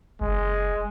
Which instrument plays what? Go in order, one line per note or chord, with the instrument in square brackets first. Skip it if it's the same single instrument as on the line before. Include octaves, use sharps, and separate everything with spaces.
[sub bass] F#1 [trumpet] G#3